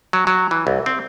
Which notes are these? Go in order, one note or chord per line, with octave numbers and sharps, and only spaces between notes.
F#3
F#3
E3
C2
C4